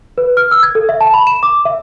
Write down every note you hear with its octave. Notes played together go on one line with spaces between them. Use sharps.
B4
F6
E6
G#6
A4
E5
A5
B5
E7
D6
E5